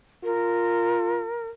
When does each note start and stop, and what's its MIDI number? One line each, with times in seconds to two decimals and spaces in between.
0.24 1.26 65
0.24 1.48 70